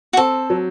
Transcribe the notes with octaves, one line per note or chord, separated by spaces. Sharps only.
F#4
C4 A4
F#3